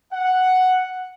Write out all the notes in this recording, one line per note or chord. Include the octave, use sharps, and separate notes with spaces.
F#5